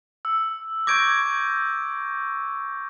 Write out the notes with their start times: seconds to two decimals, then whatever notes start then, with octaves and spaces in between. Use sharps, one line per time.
0.25 E6
0.87 C#6 D6 G6 G#6 A#6 D7